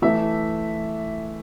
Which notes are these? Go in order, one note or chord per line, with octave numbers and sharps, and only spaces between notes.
E3 A3 E4 E5